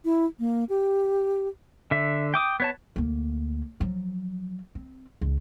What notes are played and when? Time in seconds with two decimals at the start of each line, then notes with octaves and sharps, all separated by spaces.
0.05 E4
0.39 A#3
0.69 G4
1.91 D3 E5
2.34 G5 D6 D#6
2.60 B3 C#5 A5
2.96 D2 A#3
3.80 F3 F#3
4.75 C4
5.21 C#2